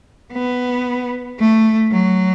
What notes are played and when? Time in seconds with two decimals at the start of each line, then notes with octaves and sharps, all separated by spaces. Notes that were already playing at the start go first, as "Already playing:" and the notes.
0.33 B3
1.40 A3
1.92 F#3